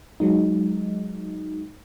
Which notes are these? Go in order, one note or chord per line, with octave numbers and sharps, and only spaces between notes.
F#3 G#3 D#4